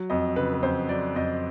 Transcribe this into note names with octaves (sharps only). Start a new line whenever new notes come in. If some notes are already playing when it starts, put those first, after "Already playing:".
Already playing: F#3
F2 D#5
C#3 B4
B4
F2 C5
F#3 D5
F2 D#5